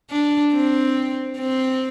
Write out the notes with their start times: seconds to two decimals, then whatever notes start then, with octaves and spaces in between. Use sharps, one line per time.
0.11 D4
0.54 C4
1.39 C4